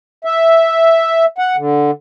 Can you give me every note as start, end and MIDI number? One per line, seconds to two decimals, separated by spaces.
0.25 1.25 76
1.38 1.56 78
1.56 1.91 50